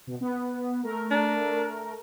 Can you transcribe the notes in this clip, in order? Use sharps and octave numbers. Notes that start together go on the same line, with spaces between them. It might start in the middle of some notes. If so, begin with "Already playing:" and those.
B2
B3
A3 A#4
D4